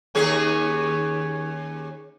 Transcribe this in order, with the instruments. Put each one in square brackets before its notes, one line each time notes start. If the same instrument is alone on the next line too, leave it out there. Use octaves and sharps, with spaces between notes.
[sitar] D#2 C#4 G#4